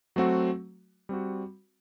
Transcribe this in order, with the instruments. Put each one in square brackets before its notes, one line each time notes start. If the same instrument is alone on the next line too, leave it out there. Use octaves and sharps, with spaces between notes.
[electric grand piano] F#3 A3 C4 F#4
G3 C4 F#4